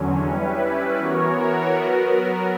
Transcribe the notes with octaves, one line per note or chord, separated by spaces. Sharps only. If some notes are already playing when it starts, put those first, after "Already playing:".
Already playing: E2 D3 F#3 C#4
G3 C#4 E4 B4
E3 B3 F#4 A#4 C#5
F#3 B3 F#4 A#4